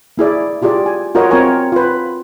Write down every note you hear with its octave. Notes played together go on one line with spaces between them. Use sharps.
A#3 E4 G#4 D5
E4 F4 G4 G#4 D5
G#5
F4 F#4 A#4 C#5 D#5 F#5
C4 F4 A#4 C#5 G#5 B5
F4 B4